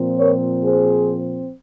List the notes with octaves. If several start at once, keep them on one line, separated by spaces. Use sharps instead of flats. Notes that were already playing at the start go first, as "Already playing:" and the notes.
Already playing: A#2 F3 C4
A#4 C#5
G#4 C5